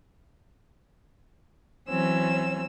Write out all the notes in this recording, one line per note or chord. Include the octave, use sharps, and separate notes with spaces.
E3 F#3 C4 C#4 E6